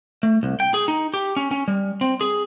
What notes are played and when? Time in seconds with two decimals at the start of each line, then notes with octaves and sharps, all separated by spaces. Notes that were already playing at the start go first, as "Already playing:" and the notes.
0.23 A3
0.43 C2
0.60 G5
0.74 G#4
0.88 D#4
1.14 G4
1.36 C#4
1.51 C#4
1.68 G3
2.01 C4
2.21 G#4